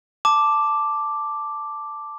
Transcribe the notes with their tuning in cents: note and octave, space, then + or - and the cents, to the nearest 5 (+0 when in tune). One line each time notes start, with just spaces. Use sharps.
A5 +0 D6 +0